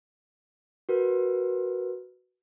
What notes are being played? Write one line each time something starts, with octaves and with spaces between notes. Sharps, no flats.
F#4 A#4 B4